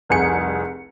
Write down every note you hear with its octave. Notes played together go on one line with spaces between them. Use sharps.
F1 C2 G#4 C#7